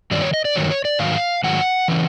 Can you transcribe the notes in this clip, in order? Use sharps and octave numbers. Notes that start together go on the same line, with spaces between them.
G2 D#3 F#3 D5
C#5
D#5
D5
G2 D#3 F#3 C#5
C#5
D5
G#2 D#3 F#3 F5
G#2 D#3 F#3 F#5
C#3 E3